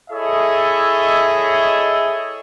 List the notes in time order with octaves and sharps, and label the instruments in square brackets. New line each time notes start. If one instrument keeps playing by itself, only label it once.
[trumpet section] E4 G#4 A4 C#5 D#5 E5